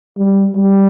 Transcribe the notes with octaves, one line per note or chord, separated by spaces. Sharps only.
G3
G3